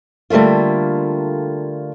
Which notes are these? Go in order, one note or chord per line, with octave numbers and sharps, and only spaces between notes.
D3 G3 A3 A#3 F4